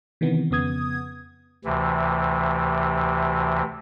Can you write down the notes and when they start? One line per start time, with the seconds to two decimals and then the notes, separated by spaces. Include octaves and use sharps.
0.21 C3 D#3 E3 B3
0.51 F2 C#3 B3 D#6 G#6
1.65 D2 C3 E3